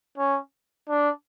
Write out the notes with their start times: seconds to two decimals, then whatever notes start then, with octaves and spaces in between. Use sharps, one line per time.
0.18 C#4
0.89 D4